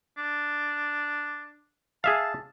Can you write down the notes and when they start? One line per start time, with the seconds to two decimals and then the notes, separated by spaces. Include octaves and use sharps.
0.17 D4
2.04 G#4 E5 F5 A5